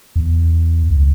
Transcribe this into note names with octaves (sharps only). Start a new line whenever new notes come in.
E2
C#2